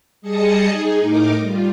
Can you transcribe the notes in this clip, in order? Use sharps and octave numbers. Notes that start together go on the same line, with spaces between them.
G3 G#4 D#5 A5 D#6 C#7
D#4 G#4
A2 D#4 A#4 D6
G3 F4